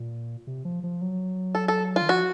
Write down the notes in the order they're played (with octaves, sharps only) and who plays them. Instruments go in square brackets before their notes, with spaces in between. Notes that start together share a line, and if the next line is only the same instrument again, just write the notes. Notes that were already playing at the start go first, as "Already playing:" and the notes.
Already playing: [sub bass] A#2
C3
F3
F3
F#3
[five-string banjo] A4
A4
F4
[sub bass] D#3
[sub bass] F3 [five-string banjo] F#4